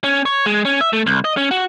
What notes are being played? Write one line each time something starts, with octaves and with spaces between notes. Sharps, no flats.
C#4
C#5
G#3
C#4
E5
A3
C2
D#5
C#4
F#4